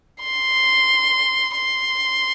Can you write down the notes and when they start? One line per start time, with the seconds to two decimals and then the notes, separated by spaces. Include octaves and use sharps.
0.23 C6
1.56 C6